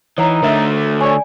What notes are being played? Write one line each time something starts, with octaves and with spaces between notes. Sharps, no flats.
E3 D#4 C#5 F#5 A#5
D3 A3 A#4 E5 F#5
C#5 D5 G#5